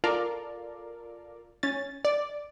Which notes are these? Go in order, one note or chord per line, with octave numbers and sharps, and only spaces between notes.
F4 A4 A#4 D5 F5
C#4 A6
D5